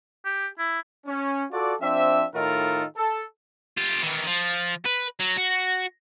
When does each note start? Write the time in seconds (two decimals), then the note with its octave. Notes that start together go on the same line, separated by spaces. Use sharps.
0.25 G4
0.59 E4
1.07 C#4
1.51 F4 F#4 A4 D5
1.81 F3 C4 D4 E5
2.35 A2 D#3 D#4 F4 A4 A#4
2.97 A4
3.77 F4 G4
4.03 D#3 E3
4.27 F3
4.85 B4
5.20 F#3
5.37 F#4